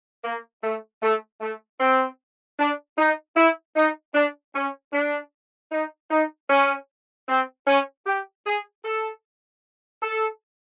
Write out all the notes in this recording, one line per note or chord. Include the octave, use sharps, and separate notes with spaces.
A#3
A3
A3
A3
C4
D4
D#4
E4
D#4
D4
C#4
D4
D#4
D#4
C#4
C4
C#4
G4
G#4
A4
A4